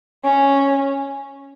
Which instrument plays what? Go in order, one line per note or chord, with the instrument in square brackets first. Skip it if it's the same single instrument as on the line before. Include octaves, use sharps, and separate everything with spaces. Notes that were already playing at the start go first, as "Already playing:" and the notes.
[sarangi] C#4